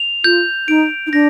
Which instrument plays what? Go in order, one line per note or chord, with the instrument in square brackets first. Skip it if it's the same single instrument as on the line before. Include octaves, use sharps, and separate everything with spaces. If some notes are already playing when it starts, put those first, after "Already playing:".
Already playing: [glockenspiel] F7
[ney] F4 [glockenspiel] G6
[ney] D#4 [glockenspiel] D7
[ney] D#4
[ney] D4 [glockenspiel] A#6